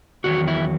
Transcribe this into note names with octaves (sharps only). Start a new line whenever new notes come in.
E2 D#3 F#3 F#4
E4